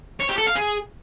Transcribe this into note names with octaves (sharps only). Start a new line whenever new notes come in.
C#5
G4
A4
F5
G#4